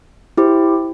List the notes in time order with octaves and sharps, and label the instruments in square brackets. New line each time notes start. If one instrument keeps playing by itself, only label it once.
[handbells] E4 G4 C5